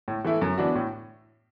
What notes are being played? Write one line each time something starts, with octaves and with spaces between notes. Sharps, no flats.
A2
E3 A3 E4
F#2
E3 B3 D4 F#4
A2